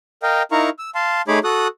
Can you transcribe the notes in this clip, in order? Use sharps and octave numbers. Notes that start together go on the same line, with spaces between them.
A#4 D#5 F5 G5
D#4 E4 A#4 F5 A#5 C#6
E6
F5 A5 C6
A3 D#4 G#4 C#5 B5 D6
F#4 A4 D#6 F#6